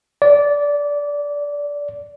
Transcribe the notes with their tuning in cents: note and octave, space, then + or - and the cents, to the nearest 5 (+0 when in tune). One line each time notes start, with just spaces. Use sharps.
D5 -15